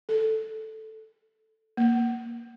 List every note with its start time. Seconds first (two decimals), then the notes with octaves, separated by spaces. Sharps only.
0.09 A4
1.77 A#3